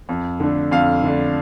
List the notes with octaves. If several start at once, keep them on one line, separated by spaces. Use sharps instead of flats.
F2
D3 A3 D4
F2 F5
D3 A3 D4